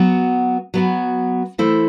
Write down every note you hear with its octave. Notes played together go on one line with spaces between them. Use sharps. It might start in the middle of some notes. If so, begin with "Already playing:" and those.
Already playing: F#3 B3 F#4
F#3 B3 F#4
E3 A3 E4 A4 C5